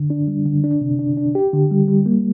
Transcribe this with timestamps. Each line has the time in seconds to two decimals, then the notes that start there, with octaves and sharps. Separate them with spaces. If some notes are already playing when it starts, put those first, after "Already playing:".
Already playing: D3
0.10 D4
0.28 G3
0.45 D3
0.64 D4
0.81 C3
0.99 D4
1.17 D4
1.35 G4
1.53 D3
1.71 G3
1.88 G3
2.06 A#3